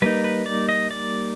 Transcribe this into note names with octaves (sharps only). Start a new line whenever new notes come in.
G3 A#3 D#4 B4
B4
D5
D#5
D5